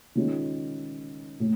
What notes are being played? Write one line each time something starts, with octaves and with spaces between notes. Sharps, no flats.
D#3 G#3 C#4 F4
A2